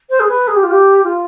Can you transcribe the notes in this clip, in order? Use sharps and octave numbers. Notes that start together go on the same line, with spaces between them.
C5
G#4
B4
G#4
G4
F4
G4
F4